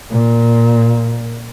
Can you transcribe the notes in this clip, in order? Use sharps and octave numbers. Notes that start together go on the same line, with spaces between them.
A#2